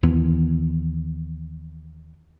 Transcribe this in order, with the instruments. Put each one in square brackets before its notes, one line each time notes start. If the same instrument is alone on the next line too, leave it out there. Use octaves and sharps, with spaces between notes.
[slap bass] D#2 E3 B3